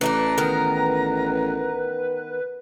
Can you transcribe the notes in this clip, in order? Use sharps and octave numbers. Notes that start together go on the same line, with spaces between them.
A1 E3 A3 D4 B4 A#5
D#3 B3 A#4